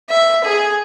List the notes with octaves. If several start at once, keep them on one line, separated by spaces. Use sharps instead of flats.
E5
G#4